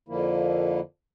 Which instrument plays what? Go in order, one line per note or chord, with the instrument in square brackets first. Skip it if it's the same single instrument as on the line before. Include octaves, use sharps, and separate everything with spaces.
[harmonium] F2 D3 F3 A#3 E4